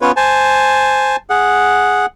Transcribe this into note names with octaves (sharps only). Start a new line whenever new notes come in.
B3 C#4 F4 B4 C#5
C5 G#5 A5
G#4 F#5